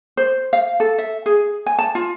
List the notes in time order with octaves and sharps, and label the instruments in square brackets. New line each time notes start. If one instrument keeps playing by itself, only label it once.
[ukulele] C5
F5
A4
E5
G#4
G#5
A5
F4